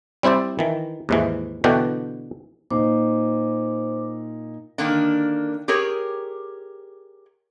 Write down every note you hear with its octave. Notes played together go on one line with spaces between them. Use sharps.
G3 C4 E4 C5 D5
D#3 E3
D#2 G#2 E3
B2 D3 E3 D4 F#4 G5
A#2 D#4 C5 D6
D3 D#3 A#3 D4
G4 G#4 A#4 C#5